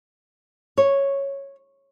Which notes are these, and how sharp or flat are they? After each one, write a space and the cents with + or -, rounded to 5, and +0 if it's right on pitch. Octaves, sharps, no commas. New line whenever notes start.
C#5 -5